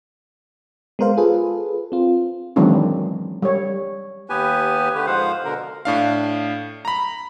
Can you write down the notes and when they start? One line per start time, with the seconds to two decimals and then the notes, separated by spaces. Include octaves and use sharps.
0.99 G#3 B3 A#4 C5 F5
1.17 F4 G#4 A4 B4
1.92 C4 F4
2.56 D#3 E3 F#3 G#3 C4 D4
3.42 G3 C#5
4.30 D#2 B3 G4 B4 G#5
4.95 D3 A3 G4 B4
5.07 G#2 F3 C5 F5 F#5
5.44 B2 D3 A#4
5.85 A2 D4 F5
6.85 A#5 B5